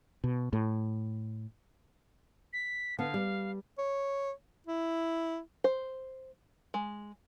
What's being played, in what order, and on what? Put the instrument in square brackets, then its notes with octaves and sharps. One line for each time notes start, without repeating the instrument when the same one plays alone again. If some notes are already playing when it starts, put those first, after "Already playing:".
[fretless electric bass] B2
A2
[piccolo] B6
[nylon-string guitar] D3 B3 [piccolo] F5
[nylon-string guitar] G3
[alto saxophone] C#5
E4
[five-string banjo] C5
G#3